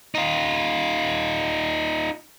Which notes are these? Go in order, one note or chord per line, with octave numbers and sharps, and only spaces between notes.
D#4 F4